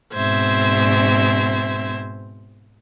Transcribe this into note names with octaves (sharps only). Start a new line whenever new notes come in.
G#2 B2 C4 C5 E5 G#6